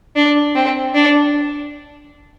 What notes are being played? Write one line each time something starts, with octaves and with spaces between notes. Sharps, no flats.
D4
C4
D4